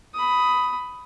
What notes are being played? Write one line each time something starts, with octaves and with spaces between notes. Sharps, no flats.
B5 D#6